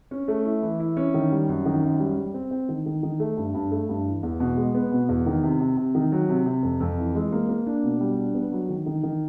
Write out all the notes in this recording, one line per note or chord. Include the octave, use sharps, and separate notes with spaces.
C#4
A3
E4
E3
E4
C#4
D#3
G3
F#2
D#3
F#2
G3
G3
C4
C4
D#3
D#3
D#3
A3
G2
G2
A3
G2
E3
E2
B2
G#3
B3
B2
E2
D#3
C3
C3
C3
D#3
F#3
C3
C3
F2
F2
E3
G#3
A#3
A#3
D4
B2
G3
D4
B3
F#3
D#3
D#3
D#3